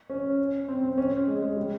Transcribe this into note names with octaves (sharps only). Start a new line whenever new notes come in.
C#4
C4
C4
C#4
G#3
G#3
G3